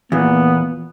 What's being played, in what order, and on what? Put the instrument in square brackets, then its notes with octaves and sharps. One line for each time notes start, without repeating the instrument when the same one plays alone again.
[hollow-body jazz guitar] E2 A#2 [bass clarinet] A#3 [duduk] B3